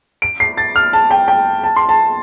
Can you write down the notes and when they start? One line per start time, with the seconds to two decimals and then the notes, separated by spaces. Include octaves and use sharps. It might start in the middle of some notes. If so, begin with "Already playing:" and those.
0.22 D7
0.40 C7
0.57 A6
0.76 F6
0.93 A5
1.11 G5
1.28 G5
1.64 A5
1.76 C6
1.89 A5